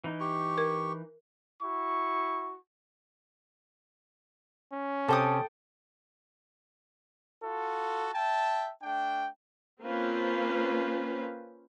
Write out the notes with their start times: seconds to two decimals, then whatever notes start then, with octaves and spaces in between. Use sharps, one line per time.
0.04 E3 D#4
0.20 G4 C#6
0.58 A#4
1.61 E4 F#4 C#6
4.72 C#4
5.08 C3 A4 G5 A5 D#6
7.43 F4 F#4 A4
8.13 E5 G5 A5
8.82 A3 D4 G5
9.82 A#3 C4 C#4 F4 B4 C5